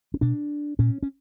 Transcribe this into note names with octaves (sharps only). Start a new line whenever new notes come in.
C#4
B2 D4
A#2 C#4
C#4